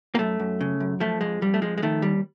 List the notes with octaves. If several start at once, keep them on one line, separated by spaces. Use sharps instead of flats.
A#3
F#2 A3
F#2
C#3
F#2
F3 A3
F2 G#3
F2 G3
A3
F3 G#3
G#3
D#3 A3
D#2 G3